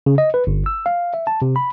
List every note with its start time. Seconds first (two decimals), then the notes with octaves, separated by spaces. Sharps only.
0.06 C#3
0.18 D#5
0.34 B4
0.47 G1
0.66 E6
0.86 F5
1.14 E5
1.27 A5
1.42 C3
1.56 B5